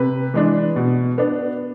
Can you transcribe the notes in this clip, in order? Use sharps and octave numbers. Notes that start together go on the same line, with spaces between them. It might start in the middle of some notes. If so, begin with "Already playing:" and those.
Already playing: C3 B4
E3 G#3 D4
B2
B3 D4